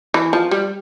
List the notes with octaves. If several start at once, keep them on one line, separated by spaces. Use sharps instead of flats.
E3
F3
G3